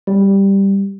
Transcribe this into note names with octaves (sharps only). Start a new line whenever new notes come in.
G3